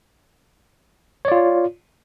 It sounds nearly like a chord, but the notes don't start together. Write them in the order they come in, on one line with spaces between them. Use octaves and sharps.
C#5 D5 F4